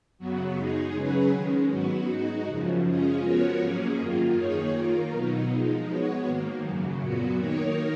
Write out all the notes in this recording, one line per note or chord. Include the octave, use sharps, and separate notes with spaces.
F#2 C#3 F#3 B3 F#4
G#3 D#4 G#4
C#3 F#3 C#4 G#4 B4
D#3 G#3 C#4
G#2 F#3 B3 F#4
G#3 D#4 F#4
F#2 C#3 F3
C#3 G#3 C#4 F4 G#4
F3 B3 F#4 A#4 C#5
G#2 F#3 A#3 C#4 G#4
F#2 D#3 A#3 F4
D#3 A#3 D#4 G#4 C#5
D#3 A#3 F4 A#4
B2 F#3 B3 D#4
F3 G#3 D#4
G#3 B3 F#4 C#5
G#2 D#3 A#3
F#2 C#3 F#3
A#2 F#3 B3 F#4
D#3 A#3 D#4 A#4 C#5